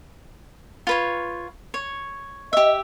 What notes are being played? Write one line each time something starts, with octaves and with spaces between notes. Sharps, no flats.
F4 B4 C#5
C#5
G4 D#5 E5